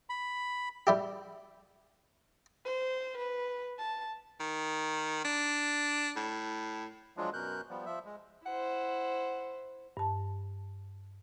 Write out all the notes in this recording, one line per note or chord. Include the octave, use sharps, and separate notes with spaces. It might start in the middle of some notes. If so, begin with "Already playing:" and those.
B5
G3 E4 G4
C5
B4
A5
D#3
D4
A2
F3 F#3 G#3 D4 F4
F#2 B2 A#4 F#6 G6
F3 G3 B3
F3 E5
G#3
E4 C5 F#5
G2 A5